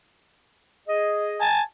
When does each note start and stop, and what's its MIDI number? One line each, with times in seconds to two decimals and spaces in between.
0.87 1.44 68
0.87 1.44 75
1.41 1.60 80
1.41 1.60 81